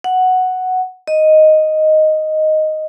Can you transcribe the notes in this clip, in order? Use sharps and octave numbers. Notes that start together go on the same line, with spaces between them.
F#5
D#5